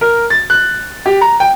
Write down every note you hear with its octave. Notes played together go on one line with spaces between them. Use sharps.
A#4
A6
F#6
G4
A#5
G5